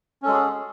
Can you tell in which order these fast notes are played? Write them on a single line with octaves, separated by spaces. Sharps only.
C#4 A4 G#3 F#4 G#4